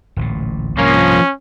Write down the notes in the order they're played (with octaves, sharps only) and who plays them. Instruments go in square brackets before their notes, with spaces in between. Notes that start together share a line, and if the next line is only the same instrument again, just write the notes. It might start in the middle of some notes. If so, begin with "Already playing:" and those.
[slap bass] D1 A1 A#2
[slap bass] C2 G#2 [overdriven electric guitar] F3 A#3 [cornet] C#4